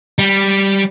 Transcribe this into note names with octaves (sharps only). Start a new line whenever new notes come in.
G3